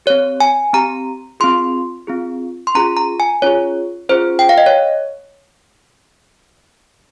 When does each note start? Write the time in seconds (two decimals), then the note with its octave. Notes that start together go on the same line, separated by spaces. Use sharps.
0.06 C4 G4 C#5
0.40 G#5
0.73 C4 G4 A#5
1.40 C4 F4 G#4 C6
2.07 C4 F4 G#4
2.67 C6
2.75 C#4 F4 G#4 A#5
2.97 A#5
3.20 G#5
3.42 C#4 F4 G#4 C#5
4.09 C#4 F4 G#4 C5
4.39 G5
4.49 F5
4.58 D#5
4.66 C#5